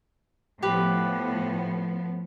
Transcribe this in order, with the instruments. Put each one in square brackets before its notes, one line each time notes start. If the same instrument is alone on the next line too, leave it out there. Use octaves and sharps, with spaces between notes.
[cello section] A2 F3 B3 [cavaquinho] G4 B4